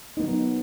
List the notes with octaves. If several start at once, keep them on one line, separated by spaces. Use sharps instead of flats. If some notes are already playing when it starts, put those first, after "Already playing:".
F#3 B3 D#4